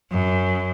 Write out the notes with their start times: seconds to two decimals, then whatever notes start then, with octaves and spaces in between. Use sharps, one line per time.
0.12 F#2